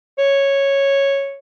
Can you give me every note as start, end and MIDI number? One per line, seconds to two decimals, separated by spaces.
0.18 1.38 73